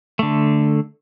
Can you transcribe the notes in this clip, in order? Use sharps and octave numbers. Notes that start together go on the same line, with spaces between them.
D3 A3